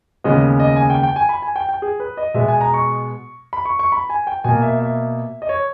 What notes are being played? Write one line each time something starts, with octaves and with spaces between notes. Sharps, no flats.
D#2 C#3 G#3 B3 D#5
D#5
G#5
G5
G5
G#5
B5
G#5
G5
G5
G#4
B4
D#5
B2 G#3 B3 E5
G#5
A#5
C#6
B5
C#6
C#6
B5
G#5
G5
B2 A#3 G#5
E5
E5
D#5
C#5